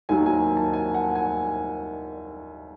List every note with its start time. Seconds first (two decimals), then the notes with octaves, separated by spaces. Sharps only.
0.09 D#2 D#3 F#3 G#5
0.26 G#5
0.57 A5
0.73 G#5
0.94 F#5
1.15 G#5